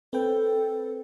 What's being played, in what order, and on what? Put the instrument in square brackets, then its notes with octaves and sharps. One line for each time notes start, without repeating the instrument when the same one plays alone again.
[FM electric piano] C4 B4 G5 [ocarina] A4